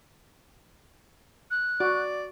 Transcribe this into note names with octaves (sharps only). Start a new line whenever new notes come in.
F#6
F#4 D5